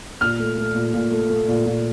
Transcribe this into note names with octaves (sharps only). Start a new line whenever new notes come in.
A#2 F6
A3
A3
A#2
A#2
A3
A3
A#2
A#2